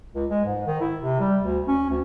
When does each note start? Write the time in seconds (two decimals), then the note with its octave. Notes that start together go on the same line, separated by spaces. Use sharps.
0.15 C#2
0.30 G#3
0.45 G#2
0.67 D#3
0.81 E4
1.02 C3
1.20 G3
1.42 D2
1.68 C#4
1.90 D2